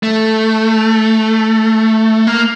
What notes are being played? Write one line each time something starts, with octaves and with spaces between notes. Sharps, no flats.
A3
A#3